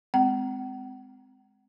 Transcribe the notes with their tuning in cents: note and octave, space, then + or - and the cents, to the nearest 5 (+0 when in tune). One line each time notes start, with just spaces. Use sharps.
G#3 +0 C4 -25 F#5 +45